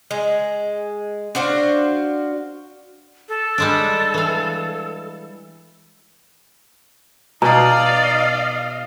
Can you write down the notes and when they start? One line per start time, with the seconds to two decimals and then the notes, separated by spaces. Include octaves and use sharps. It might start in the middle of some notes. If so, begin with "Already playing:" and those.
0.11 G#3
1.35 D4 F#4 C5 F5
3.29 A4
3.58 G3 G#3 D4
4.14 E3 F5
7.42 B2 D#4 D5 D#5 F5 A#5